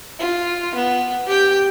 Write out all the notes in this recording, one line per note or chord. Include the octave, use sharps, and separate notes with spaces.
F4
B3
G4 G5